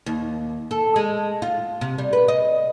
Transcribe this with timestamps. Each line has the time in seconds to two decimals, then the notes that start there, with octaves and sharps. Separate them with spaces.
0.06 D#2
0.71 A4
0.96 G#3
1.42 F4
1.81 C3
1.98 G3
2.13 B4
2.28 D#5